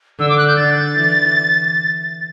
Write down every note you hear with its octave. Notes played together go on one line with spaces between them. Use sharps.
D3 E6
D6
F#6
G6
D3 A6
E3